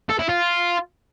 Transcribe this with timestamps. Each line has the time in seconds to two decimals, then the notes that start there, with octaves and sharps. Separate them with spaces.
0.10 A4
0.19 E4
0.29 F4